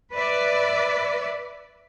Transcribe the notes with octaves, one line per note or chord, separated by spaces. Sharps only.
B4 D5 E5